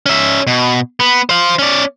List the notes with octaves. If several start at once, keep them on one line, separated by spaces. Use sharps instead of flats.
C#4 E5
B2
B3
C5 F5
C#4 D5